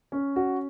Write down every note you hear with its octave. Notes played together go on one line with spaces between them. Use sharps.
C#4
F#4